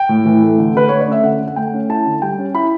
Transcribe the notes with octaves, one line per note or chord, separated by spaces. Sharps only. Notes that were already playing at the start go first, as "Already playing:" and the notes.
Already playing: G5
A2
E3
A3
D3
D3 B4
A3 C#5
D5
C#4 E5
D3 F#5
D3
F#5
A3 G5
C#4
E4 A5
D3
G3 G5
C#4
E4 B5